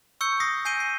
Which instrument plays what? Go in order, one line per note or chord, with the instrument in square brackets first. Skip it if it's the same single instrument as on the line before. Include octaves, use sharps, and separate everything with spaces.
[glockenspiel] C#6 E6 G6 C#7
C#6 D#6 A#6 C7
G#5 G6 C7 D7 D#7 G7
C7